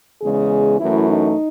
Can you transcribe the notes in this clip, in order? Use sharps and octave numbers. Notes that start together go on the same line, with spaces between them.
E2 C#3 G#3 G#4
F#2 E3 A3 E4
D#4